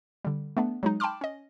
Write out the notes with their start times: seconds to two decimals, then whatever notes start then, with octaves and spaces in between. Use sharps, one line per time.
0.24 D3 G3
0.57 A3 B3 D4
0.83 F#3 G#3 D#4
1.00 G5 A5 B5 C6 D6 F6
1.21 C#4 D#5